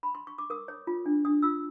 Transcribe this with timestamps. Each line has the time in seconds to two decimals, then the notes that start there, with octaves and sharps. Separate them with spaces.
0.03 B5
0.15 C6
0.27 C#6
0.38 D6
0.50 A#4 D#6
0.68 C#5
0.87 F4
1.06 D4
1.25 D4 D#6
1.43 F4 E6